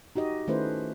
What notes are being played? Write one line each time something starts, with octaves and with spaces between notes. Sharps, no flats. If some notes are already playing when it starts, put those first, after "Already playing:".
D#4 F#4 G4 D#5
D#3 A3 C#4 E4 B4 C5